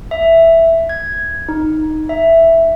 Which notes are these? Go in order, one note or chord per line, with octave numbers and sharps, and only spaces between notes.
E5
G#6
D#4
E5